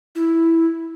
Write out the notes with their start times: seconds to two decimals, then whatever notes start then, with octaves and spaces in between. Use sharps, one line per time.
0.15 E4